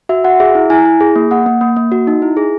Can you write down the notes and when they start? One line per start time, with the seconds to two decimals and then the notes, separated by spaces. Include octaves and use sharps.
0.09 F#4 E5
0.24 F#4 F#5
0.40 G#4 E5
0.55 E4
0.70 E4 G#5
0.85 E4
1.00 G#4
1.16 A#3
1.31 A#3 F#5
1.46 A#3
1.61 A#3
1.76 A#3
1.92 F#4
2.07 D#4
2.22 E4
2.37 G#4